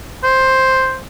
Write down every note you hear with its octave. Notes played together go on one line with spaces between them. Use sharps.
C5